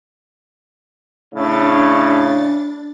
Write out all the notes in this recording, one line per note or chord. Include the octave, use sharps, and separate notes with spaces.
A2 C#3 D4 A6